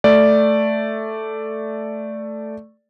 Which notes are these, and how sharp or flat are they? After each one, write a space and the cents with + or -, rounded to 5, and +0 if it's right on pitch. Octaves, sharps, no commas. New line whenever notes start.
A3 +0 D5 +0